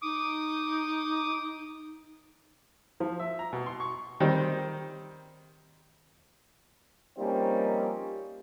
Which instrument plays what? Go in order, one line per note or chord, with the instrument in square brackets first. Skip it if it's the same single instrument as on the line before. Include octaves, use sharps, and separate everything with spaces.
[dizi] D#4 [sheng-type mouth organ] D6 D#6
[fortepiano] F3
E5
A#5
B2
C6
C#6
D#3 G3 C4
[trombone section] F3 G3 A#3 C4 C#4 D#4